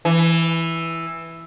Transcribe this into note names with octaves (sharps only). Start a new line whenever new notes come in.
E3